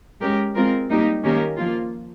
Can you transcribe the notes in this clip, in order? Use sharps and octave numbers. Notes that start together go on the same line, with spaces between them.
G#3 C#4 G4 A#4
G#3 C4 F4 A#4
G3 A#3 D#4 G4
D#3 A#3 C#4 G4 A#4
F3 A#3 F4